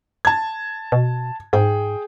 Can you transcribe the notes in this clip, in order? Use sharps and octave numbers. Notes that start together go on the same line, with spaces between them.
A5 G#6
B2
G#2 G#4 G5